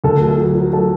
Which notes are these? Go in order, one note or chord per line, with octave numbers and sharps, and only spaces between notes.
D2 A4
A#4
F#3
A4
F#3
F#3
F#3 A4